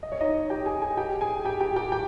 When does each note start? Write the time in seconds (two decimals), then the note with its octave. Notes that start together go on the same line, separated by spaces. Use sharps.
0.03 D#5
0.12 C#5
0.21 D#4 D#5
0.50 G4 G5
0.66 G#4 G#5
0.82 G#4 G#5
0.97 G4 G5
1.21 G#4 G#5
1.45 G4 G5
1.61 G4 G5
1.76 G4 G5
1.92 G4 G5